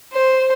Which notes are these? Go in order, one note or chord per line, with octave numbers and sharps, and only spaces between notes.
C5